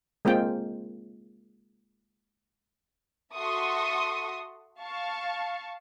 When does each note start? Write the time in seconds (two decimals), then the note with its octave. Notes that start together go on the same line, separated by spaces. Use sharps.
0.25 G#3 A#3 C4 F4 G5
3.33 F#4 A4 E5 C6 C#6 D#6
4.81 F5 A5 C#6